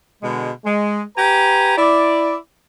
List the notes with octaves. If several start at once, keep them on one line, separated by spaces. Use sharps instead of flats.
B2 D3 G#3
G#3
G4 B4 G#5 A#5
E4 D5